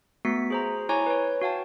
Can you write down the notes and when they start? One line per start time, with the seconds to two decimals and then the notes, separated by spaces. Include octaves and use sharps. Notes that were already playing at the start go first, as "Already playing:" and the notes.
0.25 A3 B3 F#4 B6 C#7
0.50 G#4 C5 A#5
0.89 E4 C#5 G#5 A#5 C#6 D6
1.06 B4 C#5
1.41 F#4 F5 G5 A5